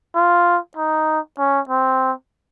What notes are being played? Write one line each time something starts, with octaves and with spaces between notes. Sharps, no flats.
F4
D#4
C#4
C4